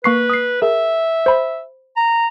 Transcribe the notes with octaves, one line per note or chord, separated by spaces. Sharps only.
A#3 B4 C#6 C7
D#6 C7
G#4 A#4 E5
C5 B5
A#5